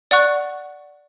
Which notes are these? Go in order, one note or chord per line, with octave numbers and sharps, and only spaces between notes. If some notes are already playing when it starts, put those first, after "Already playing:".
D5 F#5 C#6 F#6